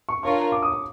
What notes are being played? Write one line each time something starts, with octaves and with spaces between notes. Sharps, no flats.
C#6
D4 F4 A#4 C#5 C#6
D6
D#6
D6